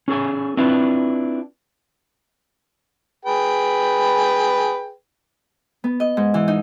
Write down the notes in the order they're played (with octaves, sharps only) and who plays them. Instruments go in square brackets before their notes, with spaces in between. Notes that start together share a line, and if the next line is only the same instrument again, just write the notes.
[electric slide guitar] C#4 G#4 A4 G#5
C4 D4 E4 F4 B4
[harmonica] G#4 B4 G5
[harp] B3
D#5
G#2
E3
D#4